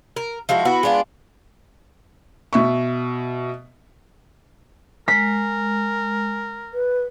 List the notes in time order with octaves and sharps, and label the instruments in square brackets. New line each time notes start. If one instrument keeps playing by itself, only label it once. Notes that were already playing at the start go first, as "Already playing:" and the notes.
[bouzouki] A#4
F3 G#3 E4 F#4
B3 E4 F#4
G#3 B3 D4 F4
[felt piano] B2 E5 C#6
[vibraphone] G#3 [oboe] A#4 [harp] B6
[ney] B4